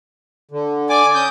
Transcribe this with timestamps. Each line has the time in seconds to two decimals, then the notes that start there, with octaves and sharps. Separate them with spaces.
0.51 D3
0.89 D5 G#5 D6
1.15 C#4 D#6 G6